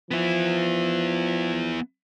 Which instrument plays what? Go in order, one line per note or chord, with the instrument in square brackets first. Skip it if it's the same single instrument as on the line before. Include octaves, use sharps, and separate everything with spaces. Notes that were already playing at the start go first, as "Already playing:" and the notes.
[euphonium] F3 [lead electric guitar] B3 E4